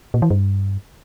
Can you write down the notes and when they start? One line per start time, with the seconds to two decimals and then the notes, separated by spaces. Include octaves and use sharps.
0.14 A#2
0.22 E3
0.30 G2